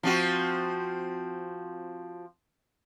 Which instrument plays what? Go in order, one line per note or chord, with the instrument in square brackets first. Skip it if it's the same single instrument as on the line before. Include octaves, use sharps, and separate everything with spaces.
[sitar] F3 C4 F#4